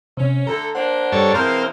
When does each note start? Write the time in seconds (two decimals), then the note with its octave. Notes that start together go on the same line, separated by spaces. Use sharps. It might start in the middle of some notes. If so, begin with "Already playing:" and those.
0.17 C3 C#4
0.47 D2 A4 A#5
0.75 A#3 D4 C5 F#5
1.12 G2 A4 C#5
1.34 B2 E3 G#3 C4 A#4 C5 F5 F6